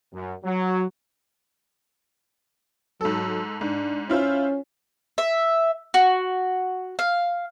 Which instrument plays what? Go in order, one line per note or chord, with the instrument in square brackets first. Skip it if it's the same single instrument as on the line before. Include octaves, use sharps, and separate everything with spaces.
[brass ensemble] F#2
F#3
[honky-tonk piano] G#2 A4 [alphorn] F#3
[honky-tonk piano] G#2 [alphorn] D4
[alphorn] C#4 [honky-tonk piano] E4 F4 C5
[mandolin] E5
F#4
F5